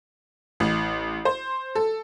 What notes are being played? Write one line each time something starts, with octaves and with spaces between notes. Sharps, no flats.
A1
C5
A4